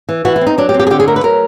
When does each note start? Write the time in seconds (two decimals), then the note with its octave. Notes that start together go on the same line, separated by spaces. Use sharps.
0.09 E3
0.25 E3 F#4
0.36 E4
0.41 C4
0.47 D#4
0.58 F#3 D4
0.69 G4
0.74 C4
0.79 G4
0.87 G#4
0.90 D3 G4
1.00 G#4
1.08 A3 A#4
1.16 B4
1.23 F#3 A#4